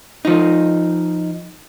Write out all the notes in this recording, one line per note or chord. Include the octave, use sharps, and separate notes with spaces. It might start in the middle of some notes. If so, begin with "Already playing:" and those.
F3 D#4